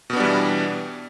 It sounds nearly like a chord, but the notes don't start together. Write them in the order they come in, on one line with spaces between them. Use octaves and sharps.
B2 B3 D4 G3 E3